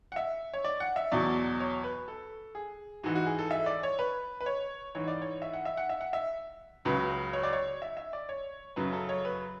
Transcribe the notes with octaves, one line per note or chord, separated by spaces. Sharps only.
F#5
E5
C#5
D5
F#5
E5
E2 B2 F#3 D5
C#5
B4
A4
G#4
G#2 E3 F#4
F#4
G#4
A4
E5
D5
C#5
B4
B4
C#5
G#2 E3 C#5
D5
C#5
E5
F#5
E5
F#5
E5
F#5
E5
C#2 C#3 F#3 B4
C#5
D5
C#5
E5
E5
D5
C#5
F#2 C#3 F#3 B4
A4
C#5
B4